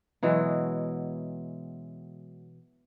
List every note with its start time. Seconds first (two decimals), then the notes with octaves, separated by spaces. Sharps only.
0.23 B2 E3 F#3 G#3